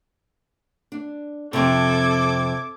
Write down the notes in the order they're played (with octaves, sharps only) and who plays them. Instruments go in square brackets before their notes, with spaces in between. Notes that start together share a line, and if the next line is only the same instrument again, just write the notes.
[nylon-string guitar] D4
[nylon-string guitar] F2 C3 [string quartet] A4 D6 G#6